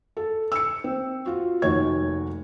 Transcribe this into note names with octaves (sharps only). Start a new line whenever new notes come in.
A4
E6 C#7
C4
F4 F#4
F1 D#2 F#4 C#5 G#6